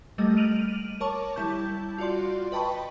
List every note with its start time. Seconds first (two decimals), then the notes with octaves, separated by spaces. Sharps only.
0.18 G3 A3 A#3 D#5
0.36 F6 D7 D#7 F7 F#7
1.00 A#4 C#5 A5 C#6 D6
1.36 G3 E4 A5 G6
1.98 F4 F#4 D5 C6
2.52 B4 D#5 G5 A5 B5 C#6